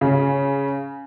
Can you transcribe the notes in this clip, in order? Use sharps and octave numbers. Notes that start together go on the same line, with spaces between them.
C#3